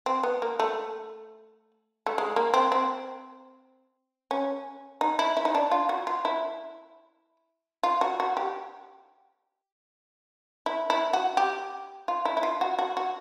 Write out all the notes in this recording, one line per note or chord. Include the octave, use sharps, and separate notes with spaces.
C4
B3
A#3
A3
A3
G#3
A#3
C4
C4
C#4
D#4
E4
E4
D#4
D4
F4
F#4
F4
E4
F4
F#4
F#4
G4
E4
E4
F#4
G4
F4
E4
E4
F4
F#4
F#4
F#4